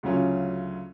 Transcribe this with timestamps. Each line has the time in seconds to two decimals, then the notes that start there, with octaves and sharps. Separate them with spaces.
0.03 D2 C#3 F#3 C#4 F4